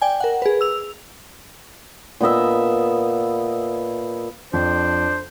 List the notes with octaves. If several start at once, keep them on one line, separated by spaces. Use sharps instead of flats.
D5 G5 G#5
A#4 F#5
G#4 B4
E6 F7
A#2 B3 D#5 E5
F2 D4 C5